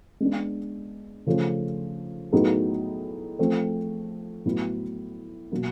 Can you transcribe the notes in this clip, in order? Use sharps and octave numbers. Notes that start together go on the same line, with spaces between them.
G#3 B3 D4
C#3 F3 A3 C#4
A2 F#3 B3 D#4 G#4
F3 A3 C4
A2 F#3 B3 E4
B2 F#3 A#3